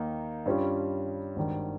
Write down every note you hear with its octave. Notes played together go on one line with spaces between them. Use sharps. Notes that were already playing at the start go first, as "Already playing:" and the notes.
Already playing: D#2 D#3 A#3 D#4
G2 G3 C#4 F4
G#1 G2 D#3